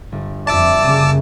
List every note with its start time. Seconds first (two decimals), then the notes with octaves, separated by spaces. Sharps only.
0.12 G1
0.47 F2 D5 E5 A5 D6 E6
0.79 F#2 C#3 A#3